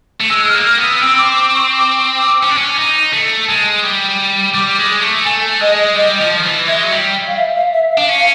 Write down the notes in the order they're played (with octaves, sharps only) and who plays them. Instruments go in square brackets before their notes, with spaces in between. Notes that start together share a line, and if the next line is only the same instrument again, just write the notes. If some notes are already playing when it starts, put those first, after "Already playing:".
[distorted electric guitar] A3
[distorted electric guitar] G#3 [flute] E6
[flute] F6
[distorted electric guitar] A#3
[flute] F6
[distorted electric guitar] B3
[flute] E6
[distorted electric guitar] C4 [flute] E6
[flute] D6
D6
C#6
D6
[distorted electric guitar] C#4
D4
C#4
D#4
A3
G#3
G3
[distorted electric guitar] G3 [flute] D6
[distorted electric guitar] G#3
A3
[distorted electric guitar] A3 [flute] G#5
[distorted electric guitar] G#3 [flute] D#5
[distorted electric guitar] G3 [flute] D#5
[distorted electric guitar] F3
D#3
E3
[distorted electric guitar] G#3 [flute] E5
[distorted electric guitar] F#3
G3
[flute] F5
E5
F5
E5
F5
[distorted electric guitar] D4
[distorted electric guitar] C#4 [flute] F5